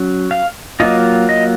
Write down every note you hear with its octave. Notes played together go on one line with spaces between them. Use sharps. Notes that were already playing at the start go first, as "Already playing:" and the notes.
Already playing: F#3 C#4
F5
F#3 A#3 F4 D#5
D#5